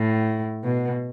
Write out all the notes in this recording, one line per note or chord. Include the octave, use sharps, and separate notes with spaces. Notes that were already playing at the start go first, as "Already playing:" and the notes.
Already playing: A2
B2